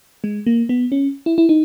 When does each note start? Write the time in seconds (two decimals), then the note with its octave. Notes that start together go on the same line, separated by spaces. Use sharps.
0.24 G#3
0.46 A#3
0.69 B3
0.92 C#4
1.26 E4
1.38 E4
1.49 D#4